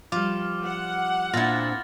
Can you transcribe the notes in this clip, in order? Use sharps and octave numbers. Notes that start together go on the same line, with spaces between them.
F3 G3 F4 D6 F6
F#5
A#2 C4 D4 E4 F4 F6 A6 A#6